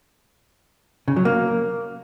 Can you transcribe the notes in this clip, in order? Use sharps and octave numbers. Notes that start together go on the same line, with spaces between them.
C#3
F#3
A#3